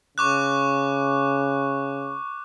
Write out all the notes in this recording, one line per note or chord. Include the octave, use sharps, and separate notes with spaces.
C#3 C#6 D6 F#6